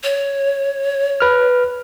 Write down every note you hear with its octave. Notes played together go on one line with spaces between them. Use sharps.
C#5
B4 F6